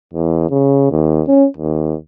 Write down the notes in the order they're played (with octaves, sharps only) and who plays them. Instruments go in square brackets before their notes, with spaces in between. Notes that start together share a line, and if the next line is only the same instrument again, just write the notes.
[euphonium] E2
C#3
D#2
C#4
D#2